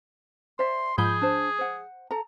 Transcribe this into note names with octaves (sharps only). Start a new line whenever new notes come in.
C5 D5 E5 C6
G#2 F3 G#4 B5 G6
D4 C5
C5 F#5
A4 A#5